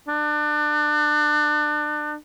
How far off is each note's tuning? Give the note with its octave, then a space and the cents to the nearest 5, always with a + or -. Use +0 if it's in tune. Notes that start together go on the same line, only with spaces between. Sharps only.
D4 +30